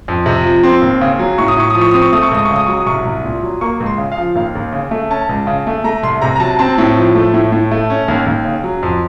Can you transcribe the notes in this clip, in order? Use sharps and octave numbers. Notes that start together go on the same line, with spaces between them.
F2
C3
F3
C4 C6
D#2
C#3
F#3
A2 C#6
D#6
A2 C#6
F3 D#6
C#6
C4 D#6
C#6
A3 D#6
C#6
C#2 D#6
C#6
C#3
D#6
F#3 C#6
D#6
C2 C#6
C2
A#2
F#3
A#3 C#6
C#2
C6
C#3
F5
F3
D#2 F5
D#2
C#3
A3
C#4 A5
C#2
C#3
A3
A3 A#5
C2 C6
C3 A#5
A#5
F#3 A5
C4 A5
A2
F3
A3
A2
A2
A3
C#4
D#2
D#2
C#3
F#3
F2